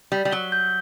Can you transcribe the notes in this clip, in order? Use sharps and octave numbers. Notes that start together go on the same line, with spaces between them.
G3 B6
G3
F#3 G7
G6